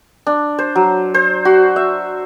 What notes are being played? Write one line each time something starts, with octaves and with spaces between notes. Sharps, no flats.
D4
C5
F#3
C5
F#4
E5